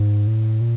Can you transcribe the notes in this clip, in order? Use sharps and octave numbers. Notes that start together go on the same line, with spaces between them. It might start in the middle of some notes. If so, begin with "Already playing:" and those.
Already playing: G#2
A2
A#2